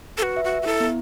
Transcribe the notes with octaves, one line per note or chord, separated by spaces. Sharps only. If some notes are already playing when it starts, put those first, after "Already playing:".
A4
F#4 B4
E5
F#4
E5
F#4
E4 A4
B3